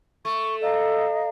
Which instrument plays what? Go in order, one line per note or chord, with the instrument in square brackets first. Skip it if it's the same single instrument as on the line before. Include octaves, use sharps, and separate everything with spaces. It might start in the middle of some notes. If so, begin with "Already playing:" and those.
[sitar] A3 [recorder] C#6
[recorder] A4 [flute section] D#5 F5 A#5